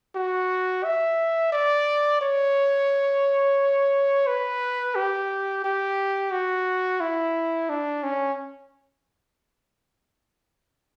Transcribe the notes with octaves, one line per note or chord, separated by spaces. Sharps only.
F#4
E5
D5
C#5
B4
G4
G4
F#4
E4
D4
C#4